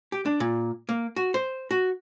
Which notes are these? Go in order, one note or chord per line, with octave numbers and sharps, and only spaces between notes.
G4
D4
A#2
A#3
F#4
C5
F#4